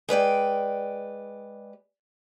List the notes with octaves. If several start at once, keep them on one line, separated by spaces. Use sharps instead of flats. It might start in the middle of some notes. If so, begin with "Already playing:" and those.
G#3 B4 D5 G5